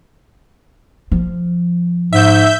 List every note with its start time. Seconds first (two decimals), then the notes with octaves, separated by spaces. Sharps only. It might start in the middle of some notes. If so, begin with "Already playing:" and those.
1.12 F3
2.13 G#2 E5 G6